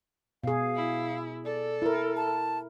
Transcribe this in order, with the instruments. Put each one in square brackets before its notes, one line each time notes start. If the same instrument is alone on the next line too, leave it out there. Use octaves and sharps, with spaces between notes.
[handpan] B2 G#4 [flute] F5
[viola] E4
[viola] A4 [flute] D5
[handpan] E4 A#4
[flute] A5